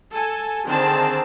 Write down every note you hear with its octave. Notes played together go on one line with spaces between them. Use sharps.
A4 G#5
D3 D#3 C4 G#4 A5